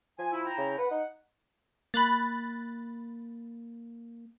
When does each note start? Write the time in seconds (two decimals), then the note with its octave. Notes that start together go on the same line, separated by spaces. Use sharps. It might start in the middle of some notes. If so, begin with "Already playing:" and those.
0.19 F3 G#5
0.32 E4
0.45 E4 G5 A#5
0.58 C#3
0.78 B4 F#5
0.91 D#4
1.94 A#3 B5 F#6 A6